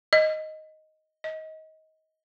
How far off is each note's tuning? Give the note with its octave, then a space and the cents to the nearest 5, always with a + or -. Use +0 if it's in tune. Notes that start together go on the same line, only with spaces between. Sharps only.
D#5 +5
D#5 +20